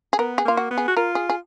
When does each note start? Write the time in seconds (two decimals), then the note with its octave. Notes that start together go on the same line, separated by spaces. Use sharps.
0.13 G#4
0.18 B3 A#4
0.38 G#4
0.45 A#3 F4
0.57 F#4
0.71 B3
0.78 G#4
0.88 F#4
0.97 F4 A#4
1.15 G#4
1.29 G#4